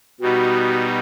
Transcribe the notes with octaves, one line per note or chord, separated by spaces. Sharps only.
B2 G3 B3 D#4 F#4